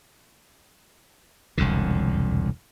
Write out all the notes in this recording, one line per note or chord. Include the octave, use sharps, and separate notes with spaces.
E1 C2 F2 D3